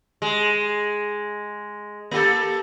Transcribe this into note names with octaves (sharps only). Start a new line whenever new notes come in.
G#3
A#3 G4 A4